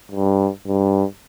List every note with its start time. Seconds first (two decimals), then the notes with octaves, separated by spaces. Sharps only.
0.12 G2
0.67 G2